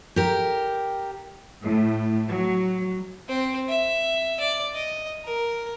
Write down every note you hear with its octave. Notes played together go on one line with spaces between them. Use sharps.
G4 A#4
A2
F#3
C4
E5
D5
D#5
A#4